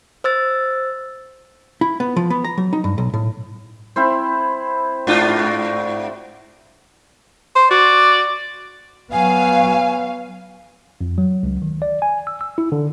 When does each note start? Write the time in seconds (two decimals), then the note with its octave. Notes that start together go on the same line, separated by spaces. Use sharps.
0.24 C5 E6 A6
1.81 E4
2.00 B3
2.16 F3
2.30 B3
2.44 A#5
2.58 F#3
2.73 D#4
2.84 G2
2.98 B1
3.14 A2
3.96 C4 E4 C5
5.07 G#2 D4 F4
5.28 F#4
7.55 C5
7.70 F#4 D5
9.13 F#3 B3 F5 G#5
11.01 F2
11.18 F#3
11.43 C#2
11.62 D#3
11.82 D5
12.02 G#5
12.27 E6
12.41 E6
12.58 E4
12.72 D3